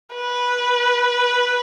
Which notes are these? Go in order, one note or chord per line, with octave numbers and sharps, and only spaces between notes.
B4